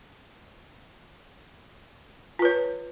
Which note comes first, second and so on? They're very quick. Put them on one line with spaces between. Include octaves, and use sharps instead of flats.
F4 B4 C#5